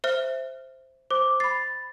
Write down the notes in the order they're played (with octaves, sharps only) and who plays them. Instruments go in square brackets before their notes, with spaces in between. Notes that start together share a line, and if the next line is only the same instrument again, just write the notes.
[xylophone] C5 E5 F6
[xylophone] C5 [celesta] D6
[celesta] B5 A6 [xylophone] C7